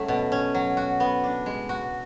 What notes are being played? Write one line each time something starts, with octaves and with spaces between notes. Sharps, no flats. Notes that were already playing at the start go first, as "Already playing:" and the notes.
Already playing: F#3 A3 C#4
B2
C#4
F#3
F#4
B3
D4
G#3
F#4